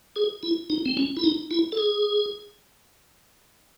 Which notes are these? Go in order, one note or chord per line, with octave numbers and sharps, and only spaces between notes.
G#4
E4
D#4
C4
C#4
E4
D#4
E4
A4
G#4